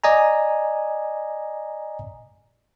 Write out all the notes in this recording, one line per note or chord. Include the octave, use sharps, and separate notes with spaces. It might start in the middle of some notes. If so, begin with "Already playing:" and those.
D5 D#5 G#5 A#5